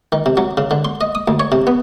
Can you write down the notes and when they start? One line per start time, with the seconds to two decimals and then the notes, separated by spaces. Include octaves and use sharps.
0.12 D#3
0.26 C3
0.37 F#3
0.57 C#3
0.71 D3
0.85 C6
1.01 D#5
1.15 D#6
1.28 D2
1.40 C#5
1.52 C3
1.67 B3